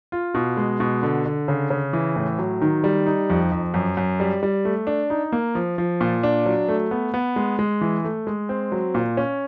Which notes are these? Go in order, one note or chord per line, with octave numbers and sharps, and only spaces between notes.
F4
B2
G#3
B2
D3
D3
C#3
C#3
E3
A2
F#3
D#3
G3
D#4
F2
F2
F#2
F#2
G3
G3
A3
D4
D#4
A#3
F3
F3
A#2
D4
F#3
A3
B3
B3
G#3
G#3
E3
A3
G#3
C4
F#3
A#2
C#4